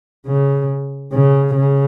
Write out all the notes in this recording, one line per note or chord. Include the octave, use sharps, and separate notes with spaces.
C#3
C#3
C#3